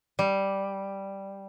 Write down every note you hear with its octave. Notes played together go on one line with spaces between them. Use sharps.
G3